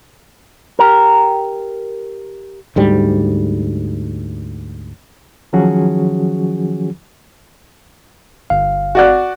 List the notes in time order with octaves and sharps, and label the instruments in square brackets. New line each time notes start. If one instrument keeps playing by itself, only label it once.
[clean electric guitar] G4 A#4
[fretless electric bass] D2 G#2 G3
[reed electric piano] D#3 F3 F#3 C#4 F#4 G#4
[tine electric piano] G1 F5
[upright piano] F#4 D5 F#6